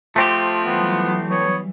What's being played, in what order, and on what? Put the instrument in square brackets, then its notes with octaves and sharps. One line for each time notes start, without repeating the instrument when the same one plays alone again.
[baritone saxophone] F3 [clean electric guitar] A3 C4 G4
[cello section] E3 F#3 G3 [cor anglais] B3
[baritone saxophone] B3 [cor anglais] C#5